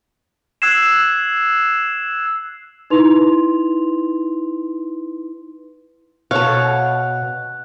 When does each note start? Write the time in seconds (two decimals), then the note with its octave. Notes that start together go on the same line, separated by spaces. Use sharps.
0.62 E6 F#6 G#6 C7 E7
2.90 D#4 E4 B4 C6 F7
6.31 B2 A4 C#5 F5 F#6